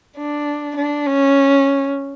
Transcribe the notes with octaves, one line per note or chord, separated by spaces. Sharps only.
D4
D4
C#4